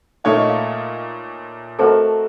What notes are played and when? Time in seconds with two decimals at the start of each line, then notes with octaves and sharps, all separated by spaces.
0.24 A#2 A3 D#4 A#4 C#5 F5
0.37 D#5
0.49 F5
1.79 A3 C4 F#4 A4 A#4 D#5 A5